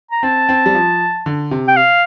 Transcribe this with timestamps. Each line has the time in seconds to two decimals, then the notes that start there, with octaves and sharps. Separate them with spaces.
0.11 A#5
0.23 C4 A5
0.49 C4
0.66 G3
0.75 F3
1.26 D3
1.51 C3
1.68 G5
1.77 F5